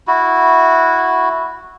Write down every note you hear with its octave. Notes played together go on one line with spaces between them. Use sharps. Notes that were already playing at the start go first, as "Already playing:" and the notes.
E4 F#4